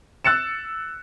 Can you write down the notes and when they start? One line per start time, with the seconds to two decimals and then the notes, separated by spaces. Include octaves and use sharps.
0.25 E6 F#6 A6 C#7 E7